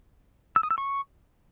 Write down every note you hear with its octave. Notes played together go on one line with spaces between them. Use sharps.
E6
D#6
E6
C#6